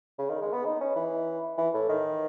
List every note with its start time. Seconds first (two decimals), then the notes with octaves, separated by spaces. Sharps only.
0.19 C#3
0.30 D#3
0.42 G#3
0.53 B3
0.65 D#4
0.81 C#4
0.96 E3
1.58 E3
1.74 A2
1.89 D#3